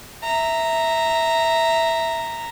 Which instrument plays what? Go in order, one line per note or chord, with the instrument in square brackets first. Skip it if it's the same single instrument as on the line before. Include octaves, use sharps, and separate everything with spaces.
[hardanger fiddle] E5 A#5